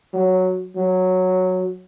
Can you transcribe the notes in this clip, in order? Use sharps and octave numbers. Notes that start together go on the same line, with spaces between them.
F#3
F#3